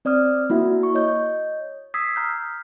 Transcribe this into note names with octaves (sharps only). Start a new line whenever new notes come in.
C4 D5 D#6 F6
A#3 E4 F#4 E5
C#6
C#5 D#5 G6
D#6 E6 G#6 B6 C7
A#5 F6 G6